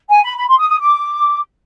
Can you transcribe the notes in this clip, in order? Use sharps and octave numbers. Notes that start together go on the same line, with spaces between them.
G#5
B5
B5
C6
D#6
D#6
D6